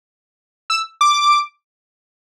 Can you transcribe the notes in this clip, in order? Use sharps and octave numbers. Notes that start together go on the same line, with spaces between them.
E6
D6